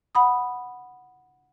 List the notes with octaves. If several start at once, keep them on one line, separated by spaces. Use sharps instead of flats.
F#5 B5 D#6